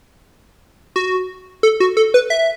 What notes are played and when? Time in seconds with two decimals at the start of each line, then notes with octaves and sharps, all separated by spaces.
0.96 F#4
1.63 A4
1.80 F#4
1.97 A4
2.14 B4
2.30 E5